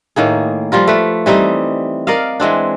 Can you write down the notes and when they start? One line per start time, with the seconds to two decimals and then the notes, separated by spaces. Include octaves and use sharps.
0.16 A2 D#3 A#3 G#4
0.72 F3 G3 F4 A#4
0.87 A3 B4
1.26 E3 G3 C4 D#4
2.07 A#4 D5 D#5 F5
2.40 E3 G#3 C4 D4